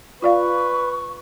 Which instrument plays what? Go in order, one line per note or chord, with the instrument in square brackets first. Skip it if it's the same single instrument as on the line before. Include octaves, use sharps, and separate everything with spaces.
[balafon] F4 D5 F5 [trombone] B4 [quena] C#6